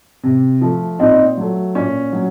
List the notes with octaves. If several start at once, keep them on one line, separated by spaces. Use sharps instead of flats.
C3
F3 A3
A#2 C4 D#4
F#3 A3
A#2 C#4
F#3